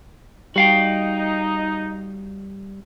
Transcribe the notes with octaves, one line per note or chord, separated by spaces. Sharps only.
G3 D#4 F#4 F5 G5